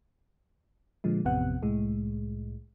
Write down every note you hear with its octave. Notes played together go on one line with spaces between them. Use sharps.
A#2 D3 F3 G#3
A1 F2 C3 B3 F#5
C2 A2 G#3